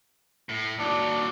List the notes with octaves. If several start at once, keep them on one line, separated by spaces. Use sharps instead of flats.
A2
D#2 F#3 D4